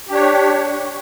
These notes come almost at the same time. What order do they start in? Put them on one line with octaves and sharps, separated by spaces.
G4 D4 C#5